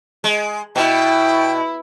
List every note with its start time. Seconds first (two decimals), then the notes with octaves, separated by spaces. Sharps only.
0.24 G#3
0.76 B2 E4 G5